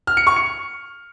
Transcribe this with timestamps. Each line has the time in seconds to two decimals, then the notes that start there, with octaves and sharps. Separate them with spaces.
0.07 F6
0.17 C#7
0.27 C#6
0.36 C#7